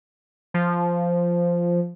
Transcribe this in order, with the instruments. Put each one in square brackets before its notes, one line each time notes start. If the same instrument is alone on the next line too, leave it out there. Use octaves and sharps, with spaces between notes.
[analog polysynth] F3